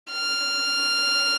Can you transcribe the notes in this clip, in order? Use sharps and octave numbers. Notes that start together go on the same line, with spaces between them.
F6